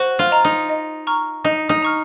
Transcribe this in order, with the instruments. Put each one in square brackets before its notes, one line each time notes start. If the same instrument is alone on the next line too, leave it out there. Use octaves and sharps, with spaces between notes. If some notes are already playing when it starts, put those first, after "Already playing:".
Already playing: [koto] F#4 [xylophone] C5
[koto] F4
[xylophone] D#5 A#5
[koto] D#4
[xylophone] D#5
A#5 C#6 F6
[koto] D#4 [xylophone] D#5
[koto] D#4
[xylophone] A#5 C#6 F6